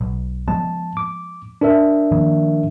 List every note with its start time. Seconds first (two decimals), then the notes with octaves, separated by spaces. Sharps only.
0.01 B1
0.48 F3 G#3 B3 A5
0.97 D6
1.61 D4 A#4 E5
2.12 D#3 F3 A#3